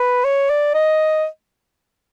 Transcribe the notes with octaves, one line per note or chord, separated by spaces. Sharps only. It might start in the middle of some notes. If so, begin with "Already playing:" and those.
Already playing: B4
C#5
D5
D#5